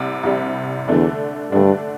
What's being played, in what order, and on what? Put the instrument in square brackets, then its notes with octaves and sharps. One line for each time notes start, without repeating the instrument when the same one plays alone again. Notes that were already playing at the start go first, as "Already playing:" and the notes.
Already playing: [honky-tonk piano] C2 C3 G3
C2 C3 G3
[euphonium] E2 [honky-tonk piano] D3 A3 D4
[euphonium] G2 [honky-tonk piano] D3 A3 D4